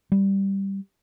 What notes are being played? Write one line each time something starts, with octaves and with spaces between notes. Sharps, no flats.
G3